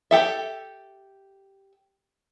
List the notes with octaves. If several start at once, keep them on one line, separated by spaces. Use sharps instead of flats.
G4 A4 E5